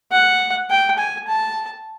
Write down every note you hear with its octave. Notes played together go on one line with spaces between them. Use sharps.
F#5
G5
G#5
A5